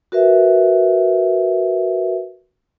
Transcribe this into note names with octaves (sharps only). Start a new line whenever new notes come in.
F#4 A#4 B4 E5